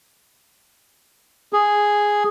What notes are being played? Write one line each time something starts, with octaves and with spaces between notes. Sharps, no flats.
G#4